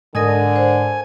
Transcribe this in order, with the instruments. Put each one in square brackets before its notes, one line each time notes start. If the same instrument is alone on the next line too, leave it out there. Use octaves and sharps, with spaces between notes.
[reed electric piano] G#2 [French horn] D3 [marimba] A#4 D#5 D#6 [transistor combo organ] G#5
[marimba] C5